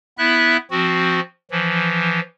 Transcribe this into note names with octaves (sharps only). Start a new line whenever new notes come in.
B3 E4 E5 F#6
F3 C4 F#4
E3 F3